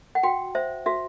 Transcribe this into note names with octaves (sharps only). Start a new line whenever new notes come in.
F#5
F#4 G5
C5 E5
F#4 E5